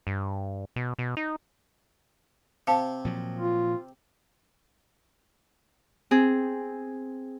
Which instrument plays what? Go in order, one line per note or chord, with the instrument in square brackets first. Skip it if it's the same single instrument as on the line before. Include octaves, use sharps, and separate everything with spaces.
[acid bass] G2
B2
B2
D#4
[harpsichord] C3 [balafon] F5 A5
[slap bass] A#2 F3 F#3
[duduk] F4
[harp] C4 G#4